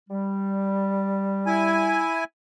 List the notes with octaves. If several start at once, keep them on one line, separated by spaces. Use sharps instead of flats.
G3
E4 G#5